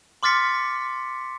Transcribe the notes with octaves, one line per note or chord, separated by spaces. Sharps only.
C6 D6 F6 A6 B6 C#7